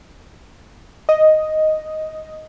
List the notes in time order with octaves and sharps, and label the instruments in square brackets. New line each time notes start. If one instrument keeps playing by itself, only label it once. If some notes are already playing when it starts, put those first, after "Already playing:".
[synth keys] D#5